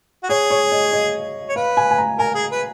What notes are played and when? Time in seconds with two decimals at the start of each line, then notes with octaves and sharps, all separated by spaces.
0.23 F#4
0.29 G#4 C#5
0.50 C#5
0.72 D#5
0.93 D#5
1.49 C#5
1.56 B4 F5
1.77 G#5
1.91 G#5
1.98 A#5
2.19 A#4 G#5
2.35 G#4
2.51 B4